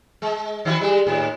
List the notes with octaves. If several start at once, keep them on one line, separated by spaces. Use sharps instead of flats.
G#3
D#3 E4 F#4
G3 G#3
D#2 A2